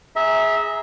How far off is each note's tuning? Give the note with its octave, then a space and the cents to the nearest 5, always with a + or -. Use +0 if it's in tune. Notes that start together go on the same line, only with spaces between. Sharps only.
G#4 +0 E5 -20 A#5 +0